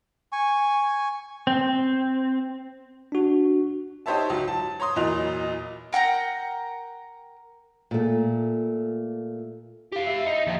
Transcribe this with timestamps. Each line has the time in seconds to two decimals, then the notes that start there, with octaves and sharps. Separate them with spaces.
0.32 G#5 C#6
1.47 C4
3.12 D4 F#4
4.06 D#4 G4 C5 C#5 E5 A5
4.30 C#2 F#3
4.48 A5
4.80 C#5 A#5 C6 D#6
4.96 E2 A#2 F#3 D#5 F#6 F7
5.93 A#4 F#5 G5 A#5
7.91 A#2 A3
9.93 G4 F5
10.06 E5
10.26 D#4
10.47 D#2 F3